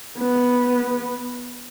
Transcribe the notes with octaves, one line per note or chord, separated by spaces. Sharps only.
B3